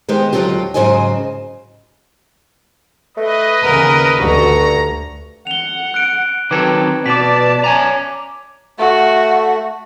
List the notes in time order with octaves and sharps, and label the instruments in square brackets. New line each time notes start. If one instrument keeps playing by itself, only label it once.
[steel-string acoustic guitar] D#3 G#3 B3 G4 C5
D#2 G#2 D3 F#3 F4 G4
G#2 C#3 F#3 C5 D#5 G#5
[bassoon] A3 [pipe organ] B4 D#5
[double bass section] D#2 C#3 [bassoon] B3 [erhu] A#4
[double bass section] D2 [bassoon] G2 [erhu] F#4 [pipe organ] A#5
[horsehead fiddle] F#5 [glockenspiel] F7 G7
[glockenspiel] F#6 D7
[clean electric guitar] D#3 F#3 A4 [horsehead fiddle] C4 [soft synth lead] B4 [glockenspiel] D6 G#6
[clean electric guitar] B2 [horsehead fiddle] D5 A5 [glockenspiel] D6 B6
[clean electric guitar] C#5 G#5 A#5
[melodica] A3 [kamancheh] F#4